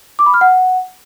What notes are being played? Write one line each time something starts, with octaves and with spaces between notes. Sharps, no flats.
D6
B5
F6
F#5